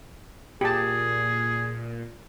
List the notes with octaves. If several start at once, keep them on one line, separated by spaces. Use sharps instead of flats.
A#2 G4 G#4 A5